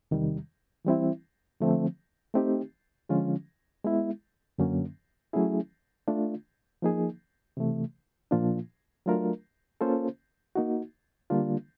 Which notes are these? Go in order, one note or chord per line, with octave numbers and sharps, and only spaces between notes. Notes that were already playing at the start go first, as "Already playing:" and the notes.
E2 C3 D#3 G3
E3 G3 C4 E4
D3 F3 A3 C4
A3 C4 D#4 G4
D3 F3 G#3 C#4 F4
G#3 B3 E4
F#2 D3 F#3 A#3 C#4
F#3 A3 C#4 E4 G#4
A3 D4 F4
F3 A#3 D#4 G#4
C3 E3 A3
A#2 F3 A#3 D4 F4
F#3 A3 D4 F4 A#4
A#3 C#4 F4 A4 C5
A#3 D#4 F#4
D3 G3 A#3 D4 F4